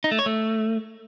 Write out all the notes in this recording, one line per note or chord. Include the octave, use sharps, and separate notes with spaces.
D#4
A3
C#5
A3